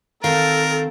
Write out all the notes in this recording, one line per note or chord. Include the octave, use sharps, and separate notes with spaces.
D#3 C4 A4 A#4 F5